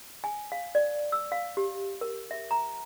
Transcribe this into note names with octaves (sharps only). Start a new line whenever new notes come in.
G#5
F5
D5
E6
F5
G4
A#4
E5
A#5